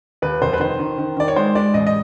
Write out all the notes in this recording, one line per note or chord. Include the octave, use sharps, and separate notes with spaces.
D#2 B4
F1 C5
B4
D#3 C5
D#3
D#3
D#3 D5
C#5
G#3 C5
G#3 D5
A1 D#5
D#5